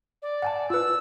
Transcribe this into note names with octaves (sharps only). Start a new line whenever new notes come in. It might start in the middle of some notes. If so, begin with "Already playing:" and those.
D5
F#5 G#5 A5
F4 B4 E6